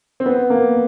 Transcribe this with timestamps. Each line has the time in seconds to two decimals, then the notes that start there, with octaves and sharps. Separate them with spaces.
0.20 C4
0.26 B3
0.50 A#3